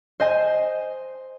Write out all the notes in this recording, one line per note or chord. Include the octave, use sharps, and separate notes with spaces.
C5 D#5 G#5